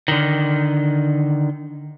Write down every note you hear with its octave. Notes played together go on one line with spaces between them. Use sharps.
D3 D#3